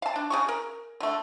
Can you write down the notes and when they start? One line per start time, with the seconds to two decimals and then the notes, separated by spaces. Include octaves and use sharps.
0.02 F5 A5
0.16 D4
0.30 C#3 G#4 C#6
0.49 A#4
1.00 D3 A3